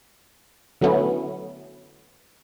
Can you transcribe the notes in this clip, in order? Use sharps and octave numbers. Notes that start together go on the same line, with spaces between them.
D3 F#3 A3 B3 C#4 E4